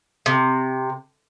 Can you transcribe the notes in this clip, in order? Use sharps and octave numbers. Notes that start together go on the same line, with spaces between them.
C3